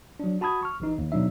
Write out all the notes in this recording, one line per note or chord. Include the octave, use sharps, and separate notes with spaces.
F#3 D4
F#4 A5 B5 D#6 G#6
C#6 F6
A1 E3 D#4
D#2
B2 F#3 D4 D#4 E5